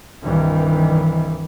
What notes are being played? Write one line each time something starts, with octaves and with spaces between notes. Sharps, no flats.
C2 G2 D#3 E3